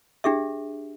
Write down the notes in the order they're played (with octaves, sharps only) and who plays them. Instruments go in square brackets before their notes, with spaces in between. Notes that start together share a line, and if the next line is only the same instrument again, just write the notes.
[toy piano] D4 G4 G#4 E5